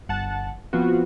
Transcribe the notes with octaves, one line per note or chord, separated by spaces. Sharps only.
G1 F#5 A5
F3 B3 C4 F4 F#4